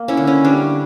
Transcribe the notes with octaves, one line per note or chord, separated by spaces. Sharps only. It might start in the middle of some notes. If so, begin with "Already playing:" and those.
Already playing: A#3
C#4 E4
D3
C#4
G3 D4